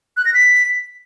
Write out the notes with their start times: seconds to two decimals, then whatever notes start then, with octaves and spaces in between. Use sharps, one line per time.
0.17 F#6
0.25 A#6
0.34 B6